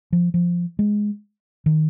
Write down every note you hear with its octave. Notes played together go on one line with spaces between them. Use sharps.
F3
F3
G#3
D#3